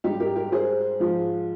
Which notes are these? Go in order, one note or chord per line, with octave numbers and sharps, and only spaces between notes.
G#2 G3 D#4 G4
G4 A#4
G4 A#4
G#4 C5
G#2 F3 G#3